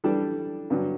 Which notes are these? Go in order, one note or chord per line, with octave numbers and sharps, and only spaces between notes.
E3 G3 D4 A4
G2 D3 F#3